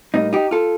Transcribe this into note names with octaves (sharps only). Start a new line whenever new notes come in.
A2 G3 A#3 C4 D#4
D#4 G4
F4 A4